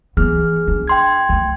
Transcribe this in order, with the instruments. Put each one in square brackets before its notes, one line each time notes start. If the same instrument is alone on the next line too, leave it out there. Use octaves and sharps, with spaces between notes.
[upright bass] E3 B3 [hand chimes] G#4 F6
[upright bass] D4
[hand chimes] G5 C6 G#6
[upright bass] D2